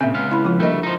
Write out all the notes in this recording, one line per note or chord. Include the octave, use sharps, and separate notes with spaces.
A#2 C#3 C4 E5
C#2 B3 F5
E4 B5
F3 F4
D2 G3 A3 A#3 A#4 D#5
F3 D#4